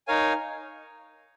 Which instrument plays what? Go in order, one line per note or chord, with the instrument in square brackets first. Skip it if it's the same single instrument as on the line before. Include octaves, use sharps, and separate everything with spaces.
[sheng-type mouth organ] D#4 A#4 C#5 F5 G#5